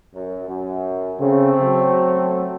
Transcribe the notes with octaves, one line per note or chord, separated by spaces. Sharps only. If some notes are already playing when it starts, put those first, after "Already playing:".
F#2
F#2
C#3 A3 C4
F#3